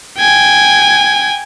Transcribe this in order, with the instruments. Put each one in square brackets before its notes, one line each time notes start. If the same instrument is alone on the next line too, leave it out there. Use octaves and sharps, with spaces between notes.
[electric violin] G5 G#5